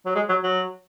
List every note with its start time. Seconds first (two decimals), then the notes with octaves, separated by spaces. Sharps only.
0.06 F#3
0.15 G#3
0.29 F#3
0.43 F#3